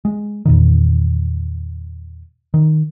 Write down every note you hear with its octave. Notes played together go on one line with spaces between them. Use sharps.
G#3
E2 A#2 D#3
D#3